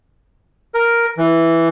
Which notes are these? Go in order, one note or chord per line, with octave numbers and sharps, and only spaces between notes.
A#4
E3